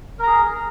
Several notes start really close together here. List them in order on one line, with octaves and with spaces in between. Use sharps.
A#4 A#5 G#4